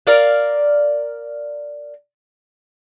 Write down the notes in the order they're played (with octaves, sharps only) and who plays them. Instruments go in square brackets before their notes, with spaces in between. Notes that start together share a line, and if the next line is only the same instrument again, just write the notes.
[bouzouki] A#4 D5 F5